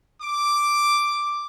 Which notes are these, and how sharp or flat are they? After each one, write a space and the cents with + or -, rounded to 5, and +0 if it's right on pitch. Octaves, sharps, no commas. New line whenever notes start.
D6 +0